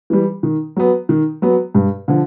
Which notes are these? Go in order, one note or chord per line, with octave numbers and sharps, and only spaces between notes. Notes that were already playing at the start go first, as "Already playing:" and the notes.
E3 G3
D#3
F#3 B3
D#3
F#3 B3
G2
D3 F3